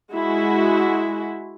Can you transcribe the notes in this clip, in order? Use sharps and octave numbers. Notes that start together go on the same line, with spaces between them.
G#3 E4 F#4